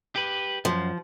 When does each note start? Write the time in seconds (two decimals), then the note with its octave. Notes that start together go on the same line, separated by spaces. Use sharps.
0.16 G4 B4
0.65 F#2 F3